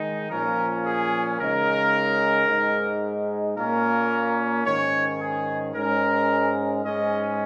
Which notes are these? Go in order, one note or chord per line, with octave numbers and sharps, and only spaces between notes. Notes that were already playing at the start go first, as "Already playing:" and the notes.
Already playing: D#3 G#3 D#4
A#2 F3 C#4 A#4
G#4
C#3 G#3 D#4 A#4
G#2 G#3 D#4
A#2 A#3 C#4 A#4
G#2 D#3 C#4 C#5
G#4
G#2 G#3 C#4 A#4
G#2 G#3 C#4 D#5